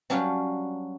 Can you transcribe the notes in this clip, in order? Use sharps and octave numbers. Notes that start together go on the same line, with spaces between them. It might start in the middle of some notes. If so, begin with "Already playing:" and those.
F#3 G3 C#4 D4 F5